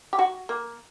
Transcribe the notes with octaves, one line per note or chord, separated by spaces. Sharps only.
G4
F#4
A#3